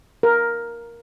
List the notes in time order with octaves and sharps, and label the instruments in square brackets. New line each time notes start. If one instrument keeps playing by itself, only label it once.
[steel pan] A#4